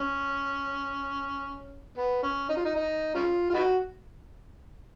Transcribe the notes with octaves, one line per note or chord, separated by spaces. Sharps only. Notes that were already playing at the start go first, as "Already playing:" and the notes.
Already playing: C#4
B3
C#4
D#4
F4
D#4
D#4
C#4 F4
F4
B3 D#4 F#4